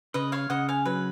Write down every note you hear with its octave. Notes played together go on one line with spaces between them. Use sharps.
C#3 B4 D#5
C#5 F5
C#3 D#5 F#5
F5 G#5
F#3 B4